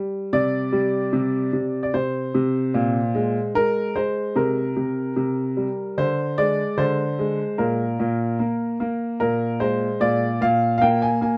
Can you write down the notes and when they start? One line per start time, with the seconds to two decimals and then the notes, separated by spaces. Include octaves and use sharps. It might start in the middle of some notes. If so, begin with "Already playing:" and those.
Already playing: G3
0.33 C3 D5
0.72 G3
1.13 C3
1.53 C3
1.83 D5
1.94 C3 C5
2.35 C3
2.74 A#2
3.15 G#3
3.55 G#3 A#4
3.96 G#3 C5
4.36 C3 A#4
4.77 C3
5.16 C3
5.57 G3
5.97 D3 C5
6.38 G#3 D5
6.77 D3 C5
7.19 G#3
7.58 A#2 A#4
8.00 A#2
8.39 A#3
8.80 A#3
9.20 A#2 A#4
9.60 G#3 C5
10.00 A#2 D5
10.41 A#2 F5
10.78 F5
10.81 A#3 G5
11.02 G#5
11.21 A#3 G#5